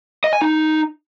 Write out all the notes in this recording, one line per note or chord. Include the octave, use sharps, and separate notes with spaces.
D#5
G#5
D#4